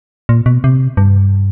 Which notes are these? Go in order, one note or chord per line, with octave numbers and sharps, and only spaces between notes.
A#2
B2
C3
G2